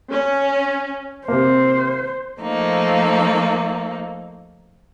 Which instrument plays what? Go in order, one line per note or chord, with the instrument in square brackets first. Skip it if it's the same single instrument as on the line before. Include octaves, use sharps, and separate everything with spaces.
[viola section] C#4
[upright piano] C3 A#3 [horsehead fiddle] C5
[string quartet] F3 A3 A#3 D#4